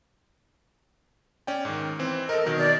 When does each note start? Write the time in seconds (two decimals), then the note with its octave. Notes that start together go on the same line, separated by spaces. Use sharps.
1.47 C#4 D5 G5
1.65 G#2 D#3
1.99 E3 C4
2.29 A4 A#4 D#5
2.46 B2 D#3 F#3
2.58 D5